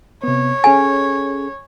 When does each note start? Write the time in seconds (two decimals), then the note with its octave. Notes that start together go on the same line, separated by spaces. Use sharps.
0.24 C3 B3 C#5
0.64 C#4 G#4 A4 G#5